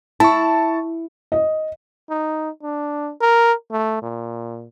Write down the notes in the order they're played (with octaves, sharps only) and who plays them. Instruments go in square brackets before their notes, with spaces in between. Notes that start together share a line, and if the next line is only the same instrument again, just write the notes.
[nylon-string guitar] E4 [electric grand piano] A5 C#6
[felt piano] D#5
[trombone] D#4
D4
A#4
A3
A#2